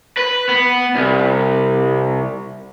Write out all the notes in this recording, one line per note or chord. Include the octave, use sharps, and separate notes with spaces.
B4
B3
C2